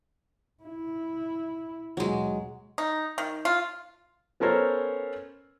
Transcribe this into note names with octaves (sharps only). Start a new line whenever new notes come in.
E4
D#2 B2 F#3 G#3
D#4
D#3
F4
B3 C#4 A4 A#4 C5 C#5